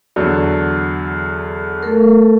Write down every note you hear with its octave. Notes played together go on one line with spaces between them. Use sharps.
E2 D3 F#3
A3 A4 A#4